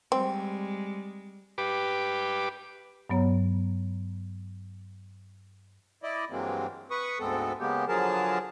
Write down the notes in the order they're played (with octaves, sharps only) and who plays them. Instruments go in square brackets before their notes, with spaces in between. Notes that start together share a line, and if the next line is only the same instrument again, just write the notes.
[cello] G3 G#3 [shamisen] C4
[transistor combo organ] G4 B4 D6
[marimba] G2 F#3 B3 C#5 A#5
[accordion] E4 D5 D#5
G2 E3 F#3 G#3 A#3 C4
B4 C#6 D#6
D2 G#2 G#3 B3 C4 A4
C#3 G#3 A#3 B3 G4
D3 F3 F#3 G#4 A#4 A5